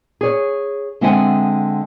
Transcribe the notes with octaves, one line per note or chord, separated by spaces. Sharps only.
G#4 C#5
D3 G#3 C4 E5 F#5 G#5